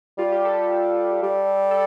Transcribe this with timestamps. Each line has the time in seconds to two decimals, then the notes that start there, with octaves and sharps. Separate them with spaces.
0.18 G3 F4
0.32 G4
0.45 A4
0.58 G4
0.71 A4
1.23 G3
1.71 A4